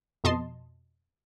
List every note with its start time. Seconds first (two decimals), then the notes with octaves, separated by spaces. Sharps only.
0.24 F2 B2 D#5 A5 C6